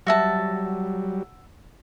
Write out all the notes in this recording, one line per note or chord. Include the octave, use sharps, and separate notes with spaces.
F#3 G3 F#4 E5 A5